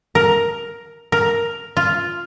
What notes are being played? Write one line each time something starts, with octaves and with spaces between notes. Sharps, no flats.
A#4
A#4
F4